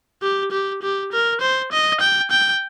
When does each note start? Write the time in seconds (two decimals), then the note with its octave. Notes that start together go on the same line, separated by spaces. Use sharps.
0.22 G4
0.52 G4
0.82 G4
1.12 A#4
1.41 C5
1.72 D#5
2.01 G5
2.31 G5